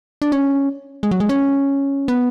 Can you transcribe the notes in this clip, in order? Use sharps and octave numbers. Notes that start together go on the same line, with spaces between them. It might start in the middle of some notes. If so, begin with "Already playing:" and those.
D4
C#4
G#3
F#3
G#3
C#4
B3